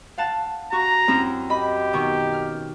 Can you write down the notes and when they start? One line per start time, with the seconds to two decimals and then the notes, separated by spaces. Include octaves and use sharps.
0.18 F5 F#5 A5
0.72 F#4 A#5 C#6
1.08 F#2 C4 E4
1.50 G4 D#5 B5
1.93 B2 D#3 C#6
2.33 F6